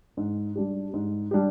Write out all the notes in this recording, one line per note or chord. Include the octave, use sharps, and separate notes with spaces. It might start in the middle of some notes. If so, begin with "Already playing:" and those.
G#2
G3 D4 G4
G#2
G3 D4 G4